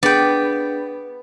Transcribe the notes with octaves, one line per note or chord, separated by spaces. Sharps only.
B3 D4 G#4 D5 G5